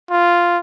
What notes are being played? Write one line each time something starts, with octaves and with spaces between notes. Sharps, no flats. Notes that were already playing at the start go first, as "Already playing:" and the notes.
F4